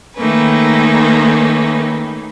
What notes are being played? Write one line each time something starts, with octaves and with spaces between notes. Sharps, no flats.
D#3 A3 A#3 C#4 B4